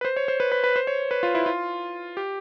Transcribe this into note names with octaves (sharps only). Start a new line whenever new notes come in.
B4
C5
C#5
C5
B4
B4
B4
C5
C#5
B4
F4
E4
F4
G4